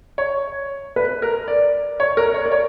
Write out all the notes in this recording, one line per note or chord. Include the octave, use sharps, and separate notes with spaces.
C#5
B4
A#4
D5
C#5
A#4
C#5
D5
C#5